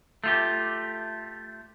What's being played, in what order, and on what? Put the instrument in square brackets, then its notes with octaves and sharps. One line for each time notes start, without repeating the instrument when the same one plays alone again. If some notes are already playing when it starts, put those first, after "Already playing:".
[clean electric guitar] A3 F4 G4